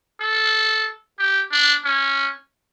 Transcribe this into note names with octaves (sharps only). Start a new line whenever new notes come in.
A4
G4
D4
C#4